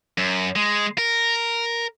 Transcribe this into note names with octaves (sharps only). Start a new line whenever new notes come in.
F#2
G#3
A#4